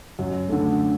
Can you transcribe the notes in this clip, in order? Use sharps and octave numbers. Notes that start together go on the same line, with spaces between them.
F#2
D3 A3